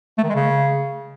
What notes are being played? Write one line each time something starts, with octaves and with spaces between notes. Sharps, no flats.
A3
D#3
G#3
C#3